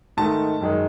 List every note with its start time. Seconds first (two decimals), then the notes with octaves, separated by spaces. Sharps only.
0.17 G#2 D#3 A3 A5
0.61 F#2 D#3 G#3